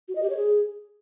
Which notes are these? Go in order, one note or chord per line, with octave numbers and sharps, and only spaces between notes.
F#4
D#5
G4
C#5
G#4